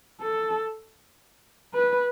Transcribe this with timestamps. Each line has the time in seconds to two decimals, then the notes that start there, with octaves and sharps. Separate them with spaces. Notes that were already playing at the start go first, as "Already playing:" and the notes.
0.21 A4
1.74 B4